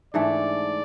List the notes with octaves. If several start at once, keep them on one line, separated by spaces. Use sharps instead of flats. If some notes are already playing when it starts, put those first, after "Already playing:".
G#2 E3 A3 D4 D5